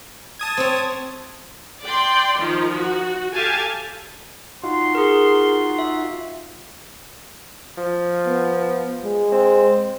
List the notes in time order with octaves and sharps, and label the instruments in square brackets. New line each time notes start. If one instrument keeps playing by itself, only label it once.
[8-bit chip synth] A5 D#6 G#6
[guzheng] C4 C#5
[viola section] D5 G5 C6
D#3 F3 F4
F#4
G4 A4 F5 G#5 A5
[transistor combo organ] D#4 F4 F#4 [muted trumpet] C6
[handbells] G#4 A#4
E5
[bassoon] F3
[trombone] B3
G#3
[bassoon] C4